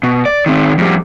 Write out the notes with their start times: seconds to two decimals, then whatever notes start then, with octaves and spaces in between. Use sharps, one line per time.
0.03 B2
0.26 D5
0.46 D#3 C4
0.78 F2 G3